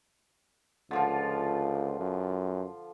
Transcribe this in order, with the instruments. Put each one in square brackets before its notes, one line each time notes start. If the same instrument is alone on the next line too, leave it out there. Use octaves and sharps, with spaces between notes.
[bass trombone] C#2 [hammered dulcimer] D3 F3 F4
[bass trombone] F#2